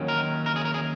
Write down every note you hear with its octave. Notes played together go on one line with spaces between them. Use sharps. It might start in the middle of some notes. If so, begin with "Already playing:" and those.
Already playing: D#2 D#3 F#3 C#4
A#4
A#4
G#4
A#4
G#4